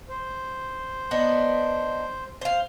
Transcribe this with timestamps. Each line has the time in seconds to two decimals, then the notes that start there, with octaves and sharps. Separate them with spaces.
0.09 C5
1.11 B3 D4 D#4
2.41 C5 F5